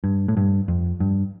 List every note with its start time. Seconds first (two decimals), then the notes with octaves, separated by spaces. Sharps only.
0.04 G2
0.28 A2
0.37 G2
0.68 F2
1.00 G2